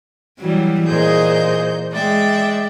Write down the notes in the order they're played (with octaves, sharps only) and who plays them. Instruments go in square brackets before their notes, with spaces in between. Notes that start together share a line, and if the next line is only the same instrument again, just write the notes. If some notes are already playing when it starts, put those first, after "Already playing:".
[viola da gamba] E3 F#3 G3
[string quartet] A#2 C5 G6 [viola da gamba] G#4 D#5
[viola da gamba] G#3 [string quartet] D5 E5 G5